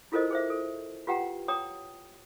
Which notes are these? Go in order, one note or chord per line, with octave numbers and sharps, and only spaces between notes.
E4 F4 A4 A#4 C5 D#5
G#4 C5 E5
A4
F4 G4 B4 F#5 G5 A#5
C#5 G5 A#5 D#6